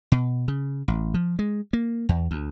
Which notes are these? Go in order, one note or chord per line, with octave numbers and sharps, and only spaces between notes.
B2
C#3
A1
F3
G#3
A#3
E2
D2